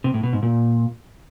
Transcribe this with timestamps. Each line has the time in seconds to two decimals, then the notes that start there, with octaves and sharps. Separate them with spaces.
0.04 C3
0.14 A2
0.23 B2
0.33 G#2
0.42 A#2